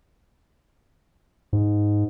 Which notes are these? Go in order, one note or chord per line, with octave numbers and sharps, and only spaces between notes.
G#2